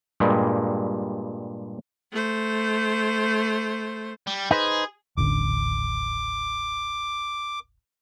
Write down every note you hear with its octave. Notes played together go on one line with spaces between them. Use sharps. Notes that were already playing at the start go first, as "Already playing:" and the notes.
G2 A#2 G3 G#3
A3 C5
G3
D#4 G#4 B4 C5
D#1 A1 D3 D6